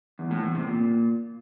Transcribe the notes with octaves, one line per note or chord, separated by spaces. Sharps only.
E2
A2
E2
C3
A#2